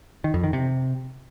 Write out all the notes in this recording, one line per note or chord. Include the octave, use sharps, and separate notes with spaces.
D#3
F2
D#3
C3